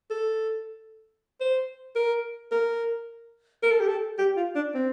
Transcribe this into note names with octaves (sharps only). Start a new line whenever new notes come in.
A4
C5
A#4
A#4
A#4
A4
G4
A4
G4
F4
D4
C4